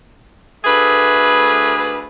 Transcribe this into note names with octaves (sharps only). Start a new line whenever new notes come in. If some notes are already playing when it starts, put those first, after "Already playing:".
D2 A3 G#4 B4